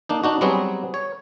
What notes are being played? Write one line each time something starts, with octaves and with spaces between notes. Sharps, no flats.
A#3 D4 D#4
D4 D#4 F#4
F#3 G3 B3 C4 F#4 G#4
C#5